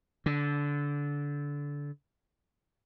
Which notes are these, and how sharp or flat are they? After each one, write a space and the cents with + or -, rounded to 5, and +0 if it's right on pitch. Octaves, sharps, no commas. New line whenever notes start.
D3 -20